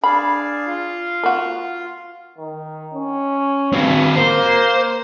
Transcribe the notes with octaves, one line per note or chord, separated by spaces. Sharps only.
D4 G#4 F5 B5
F4
A#3 F#4
D#3
C#4
G2 C4 F#4
A#3 C5